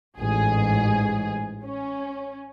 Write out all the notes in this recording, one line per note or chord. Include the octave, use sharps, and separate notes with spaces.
A1 G#2 G#4
C#4